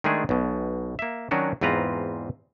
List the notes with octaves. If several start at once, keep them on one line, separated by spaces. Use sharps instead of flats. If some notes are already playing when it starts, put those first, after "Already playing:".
D#3 G#3 A3 D4 G#4
B1 B2
A#3 E5
D#3 F#3 C#4 D4 F#4
E2 G#2 C4 F4 B4 A#5